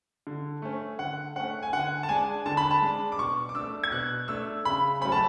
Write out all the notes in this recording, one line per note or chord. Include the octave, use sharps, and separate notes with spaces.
D3
A3 C#4
D3 F#5
A3 C#4 F#5
G#5
D3 F#5
A5
G#3 D4 G#5
D3 A5
B5
A5
G#3 D4
D6
B2 C#6
D6
A3 D4 E6
G#6
B2 F#6
A3 D4 E6
C#3 B5
F#3 A3 C#4 B5
A5